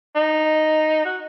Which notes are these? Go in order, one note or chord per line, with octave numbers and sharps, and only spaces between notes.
D#4
F#4